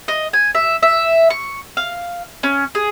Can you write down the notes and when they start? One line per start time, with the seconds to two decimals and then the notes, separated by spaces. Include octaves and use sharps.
0.08 D#5
0.33 G#5
0.55 E5
0.83 E5
1.30 C#6
1.77 F5
2.43 C#4
2.75 G#4